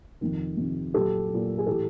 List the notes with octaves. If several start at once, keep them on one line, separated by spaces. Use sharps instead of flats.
F2 C3 D#3
F2 C3 D#3
A#2 F#3 G4 A4
A#2 F#3
G#4
A2 E3 G4 A4